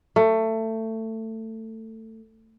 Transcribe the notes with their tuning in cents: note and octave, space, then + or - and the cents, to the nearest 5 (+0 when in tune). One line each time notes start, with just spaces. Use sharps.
A3 +20